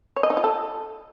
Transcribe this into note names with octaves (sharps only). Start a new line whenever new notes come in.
C#5
D#5
D#4
F4
A4